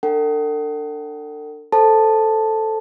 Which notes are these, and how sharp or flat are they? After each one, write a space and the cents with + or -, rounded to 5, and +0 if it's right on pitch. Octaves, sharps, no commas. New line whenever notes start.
D4 +0 A4 +40 F#5 +40
A4 +0 C5 +0 A5 +0